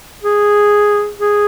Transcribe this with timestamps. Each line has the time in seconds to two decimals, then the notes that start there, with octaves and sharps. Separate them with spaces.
0.24 G#4
1.20 G#4